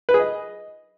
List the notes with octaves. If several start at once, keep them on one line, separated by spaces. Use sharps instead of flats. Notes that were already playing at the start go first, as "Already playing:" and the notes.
B4
G#4
D#5